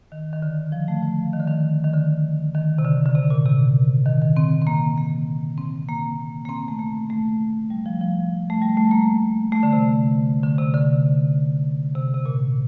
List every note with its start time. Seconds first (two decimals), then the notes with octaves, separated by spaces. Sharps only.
0.12 D#3
0.33 D#3
0.42 D3
0.72 F3
0.88 A3
1.02 F3
1.33 D#3
1.40 D3
1.48 D#3
1.84 D#3
1.94 D3
2.55 D#3
2.78 C3
2.84 D3
3.06 D3
3.15 C3
3.30 A#2
3.45 C3
4.06 D#3
4.22 D#3
4.37 C4
4.62 C4
4.67 A#3
4.98 A#3
5.58 C4
5.89 A#3
6.45 A#3
6.49 C4
6.68 A3
6.79 A#3
7.10 A3
7.70 G3
7.86 F3
8.01 F3
8.50 A3
8.62 G3
8.77 A3
8.91 A#3
9.52 A3
9.63 D3
9.73 C3
10.43 D3
10.59 C3
10.74 D3
11.95 C3
12.14 C3
12.26 A#2